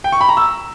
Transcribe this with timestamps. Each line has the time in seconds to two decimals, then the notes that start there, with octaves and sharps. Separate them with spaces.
0.04 G5
0.12 C#6
0.21 B5
0.29 A#5
0.37 E6